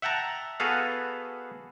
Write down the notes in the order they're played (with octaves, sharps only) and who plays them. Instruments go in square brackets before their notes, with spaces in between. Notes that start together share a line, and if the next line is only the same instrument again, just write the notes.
[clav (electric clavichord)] E5 F#5 G5 A5 A#5
B3 F#4 G#4 A4 B4 F5